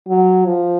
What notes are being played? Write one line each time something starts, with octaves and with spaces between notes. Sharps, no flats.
F#3
F3